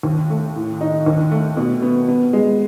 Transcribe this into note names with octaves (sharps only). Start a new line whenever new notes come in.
D#2
A3
A2
D#4
D#2
A3
B2
B3
B3
G#3